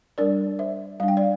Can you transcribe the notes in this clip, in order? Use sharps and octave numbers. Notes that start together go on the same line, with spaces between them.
G3 D4 A#4 D5
C5 E5
G3 D4 F5
G5
D5 F5